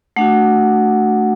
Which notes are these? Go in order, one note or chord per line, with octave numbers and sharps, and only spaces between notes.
A3 D4 F#4 F#5